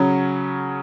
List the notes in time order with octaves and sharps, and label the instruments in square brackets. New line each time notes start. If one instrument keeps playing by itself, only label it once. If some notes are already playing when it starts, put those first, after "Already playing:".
Already playing: [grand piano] C#3 F#3 C#4